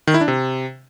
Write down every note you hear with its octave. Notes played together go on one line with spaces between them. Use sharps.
D#3
E4
D4
C3